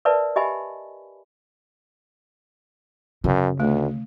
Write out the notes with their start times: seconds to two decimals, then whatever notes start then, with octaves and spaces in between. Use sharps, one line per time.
0.05 A#4 B4 D5 E5 A5
0.36 G4 D#5 E5 G#5 B5
3.24 F#2 C#3
3.60 D2 A3